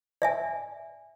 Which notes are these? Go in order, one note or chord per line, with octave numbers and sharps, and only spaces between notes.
D5 E5 G#5